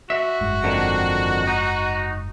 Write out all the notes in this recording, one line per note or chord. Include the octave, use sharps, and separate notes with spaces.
F#4 E5
F#1 G#2
F2 D3 D#3
D#4